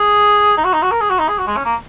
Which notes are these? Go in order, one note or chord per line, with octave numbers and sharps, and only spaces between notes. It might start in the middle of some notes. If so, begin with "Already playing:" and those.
Already playing: G#4
D#4
F#4
D#4
F#4
A#4
G#4
F#4
D#4
G#4
F#4
G#3
C#4
A#3